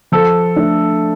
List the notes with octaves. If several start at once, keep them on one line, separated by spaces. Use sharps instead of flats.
F3 A4
A3 D4